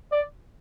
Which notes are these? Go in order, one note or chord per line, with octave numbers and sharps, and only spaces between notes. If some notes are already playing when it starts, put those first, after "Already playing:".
D5